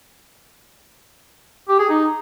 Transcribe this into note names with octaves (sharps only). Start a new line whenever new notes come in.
G4
G#4
D#4